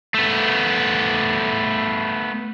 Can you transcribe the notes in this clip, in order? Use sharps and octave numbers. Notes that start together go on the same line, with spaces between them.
A3 B3